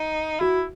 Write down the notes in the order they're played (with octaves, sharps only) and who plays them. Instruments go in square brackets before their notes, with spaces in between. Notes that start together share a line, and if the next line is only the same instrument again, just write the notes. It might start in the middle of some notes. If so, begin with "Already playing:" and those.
Already playing: [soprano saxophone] D#4
[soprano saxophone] E4 [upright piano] F#4